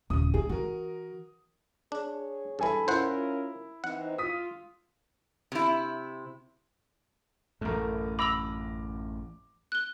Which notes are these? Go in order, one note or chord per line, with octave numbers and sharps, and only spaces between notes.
D#1 C#3 D#6
E4 G#4
E3 F#4 A#4
D4 G#4 C#5
G2 E3 A4 G#5 B5
C#4 E4 F4 A#4 C5 F#5
E3 C4 D#4 F#5
F4 D#6 B6
C3 E4
A1 F#2 A3 A#4
B5 D6 E6 A#6 F7 F#7
F#6 G7